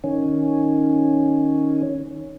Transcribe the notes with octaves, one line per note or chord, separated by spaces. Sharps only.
D#3 C#4